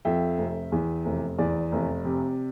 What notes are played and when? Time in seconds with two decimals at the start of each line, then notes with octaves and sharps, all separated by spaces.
0.05 F2 E5 G5
0.38 F1
0.72 E2
1.05 F1
1.38 E2 D5
1.72 F1
2.05 C3